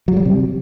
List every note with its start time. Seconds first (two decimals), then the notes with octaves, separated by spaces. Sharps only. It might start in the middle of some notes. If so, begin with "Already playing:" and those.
0.08 F#3
0.17 G3
0.25 C3